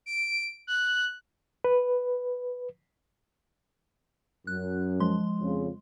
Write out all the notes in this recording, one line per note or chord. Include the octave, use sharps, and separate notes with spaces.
D7
F#6
B4
F#2 F#6
F3 G#3 C6
F2 C#3